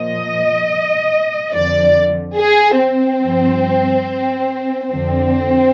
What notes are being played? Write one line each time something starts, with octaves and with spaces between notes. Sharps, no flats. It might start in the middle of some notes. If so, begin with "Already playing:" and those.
Already playing: A#2 F3 D#5
F2 D3 F3 D5
G#4
C4
G2 F3
F2 D3 F3 C4